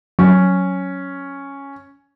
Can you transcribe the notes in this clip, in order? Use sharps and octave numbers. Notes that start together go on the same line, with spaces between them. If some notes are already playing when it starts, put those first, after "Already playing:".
F#3 C#4